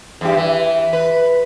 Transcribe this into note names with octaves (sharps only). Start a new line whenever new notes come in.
E2 G2 G4
E3
B4